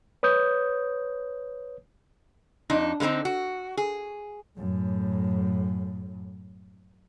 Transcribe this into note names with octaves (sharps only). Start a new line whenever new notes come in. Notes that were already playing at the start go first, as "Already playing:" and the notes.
B4 C#5 D#6 G6
F2 D4 D#4
D3 G#3 A#3 C4 D#4
F#4
G#4
F#2 A2